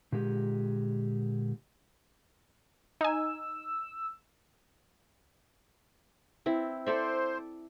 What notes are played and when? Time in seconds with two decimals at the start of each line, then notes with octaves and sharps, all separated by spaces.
0.12 A#2 D3 G#3 G4
3.01 D#4 G#5 E6
6.46 C4 E4
6.86 A4 C5 D5 E5